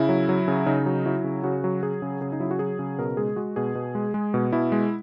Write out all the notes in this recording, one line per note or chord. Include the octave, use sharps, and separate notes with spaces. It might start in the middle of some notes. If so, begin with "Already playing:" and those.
Already playing: C#3 E4
F#3
F#3
C#3
C#3 D#4
F#3
F#3 E4
C#3
C#3 F#4
F#3
F#3 G#4
C#3
C#3 G#4
D#4
F#3 E4
F#4
F#3 G#4
C#3
B2 A#4
G#3 G#4
G#3 F#4
B2 G#4
B2
G#3
G#3
B2
B2 E4
G#3